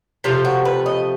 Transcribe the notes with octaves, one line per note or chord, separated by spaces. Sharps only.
C3 F3 A3 F4
F#4
B4
D#5